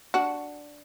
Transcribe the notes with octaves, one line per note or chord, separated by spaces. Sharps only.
D4 F#4